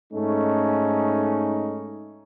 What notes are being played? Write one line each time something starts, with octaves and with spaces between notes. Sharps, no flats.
G#2 A3 C#4 D#4